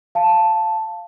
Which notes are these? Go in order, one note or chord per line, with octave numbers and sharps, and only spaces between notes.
F5 A5